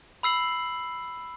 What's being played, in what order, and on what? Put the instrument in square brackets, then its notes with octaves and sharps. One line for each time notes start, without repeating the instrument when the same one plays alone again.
[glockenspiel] B5 E6 C7 F#7